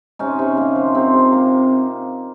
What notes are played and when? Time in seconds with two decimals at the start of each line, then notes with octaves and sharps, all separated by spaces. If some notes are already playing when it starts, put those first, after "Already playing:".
0.19 C3 C#4 D#4
0.39 C3
0.57 A#3
0.76 F3
0.94 C3 C4
1.14 C3
1.32 A#3